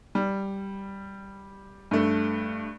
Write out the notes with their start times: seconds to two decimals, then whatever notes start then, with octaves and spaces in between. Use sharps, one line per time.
0.15 G3
1.91 G2 A3